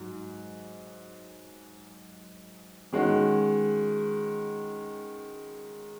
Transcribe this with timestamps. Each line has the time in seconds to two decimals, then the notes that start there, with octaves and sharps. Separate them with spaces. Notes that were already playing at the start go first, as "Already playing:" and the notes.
Already playing: G#2 F#3
2.93 D#3 G#3 C#4 F#4